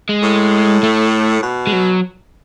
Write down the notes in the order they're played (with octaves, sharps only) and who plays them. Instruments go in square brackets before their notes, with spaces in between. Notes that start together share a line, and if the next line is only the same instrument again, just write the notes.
[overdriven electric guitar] G#3
[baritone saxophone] A2
[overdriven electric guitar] A3
[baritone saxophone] B2
[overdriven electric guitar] G#3
F#3